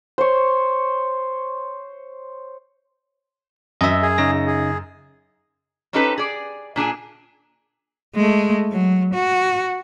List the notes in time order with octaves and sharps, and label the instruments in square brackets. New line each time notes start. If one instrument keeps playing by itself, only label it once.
[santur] C5 C#5
[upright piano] F#2 E6 [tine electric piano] D#5 E5
[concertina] G#4
[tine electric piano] C#3 D#4 A#6
[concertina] G#4
[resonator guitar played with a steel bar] C4 C#4 D#4 G4 A4 B4
G#4 D5
A#2 D4 G#4 G#5
[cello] G#3 A3
F#3
F#4